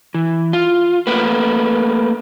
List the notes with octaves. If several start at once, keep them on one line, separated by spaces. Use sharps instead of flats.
E3
F4
A3 A#3 B4